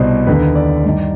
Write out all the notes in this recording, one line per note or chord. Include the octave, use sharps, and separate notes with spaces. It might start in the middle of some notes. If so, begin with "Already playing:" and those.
Already playing: C2 B2 C5
D#2 D3 B4
D5
G2 D#3